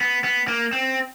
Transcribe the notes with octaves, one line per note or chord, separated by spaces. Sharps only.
B3
B3
A#3
C4